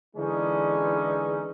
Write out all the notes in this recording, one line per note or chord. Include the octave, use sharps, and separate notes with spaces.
D3 E3 G#3 C#4 D#4